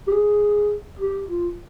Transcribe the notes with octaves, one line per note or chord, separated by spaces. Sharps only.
G4
G#4
G4
F4